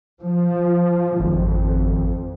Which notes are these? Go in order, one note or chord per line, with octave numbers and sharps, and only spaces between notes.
F3
G#1 F2